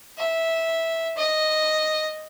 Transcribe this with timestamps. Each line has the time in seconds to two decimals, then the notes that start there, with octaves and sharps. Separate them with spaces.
0.18 E5
1.17 D#5